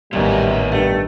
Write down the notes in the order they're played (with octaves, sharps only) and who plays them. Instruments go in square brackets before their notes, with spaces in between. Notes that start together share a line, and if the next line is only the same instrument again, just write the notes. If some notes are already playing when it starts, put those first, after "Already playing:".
[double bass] A1 D#3 [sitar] F#2 [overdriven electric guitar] A#2 B3 [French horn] G3
[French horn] G2 [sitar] A3